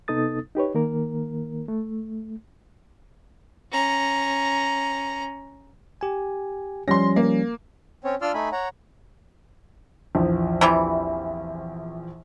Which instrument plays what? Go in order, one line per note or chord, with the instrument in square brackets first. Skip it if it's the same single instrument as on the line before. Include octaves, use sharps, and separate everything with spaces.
[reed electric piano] C3 B3 D#4 A4 D#6 A6
D#4 G4 B4 C#5
D#3 A#3 A#4
A3
[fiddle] C#4 A#5
[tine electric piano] G4 G#5
[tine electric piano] F3 G3 C#4 [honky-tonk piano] C6 A#6
[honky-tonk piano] A#3
[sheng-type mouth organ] C4 C#4 C#5
D4 F4 D5 C6 E6 F6
A3 D#4 G#5 B5
C#5 F#5 A#5
[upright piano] A#1 E2 F3
[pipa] C3 E3 G3